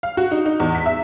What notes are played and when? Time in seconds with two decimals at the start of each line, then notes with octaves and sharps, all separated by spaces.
0.03 F5
0.17 F#4
0.31 D#4
0.46 D#4
0.60 E2
0.75 B6
0.86 E5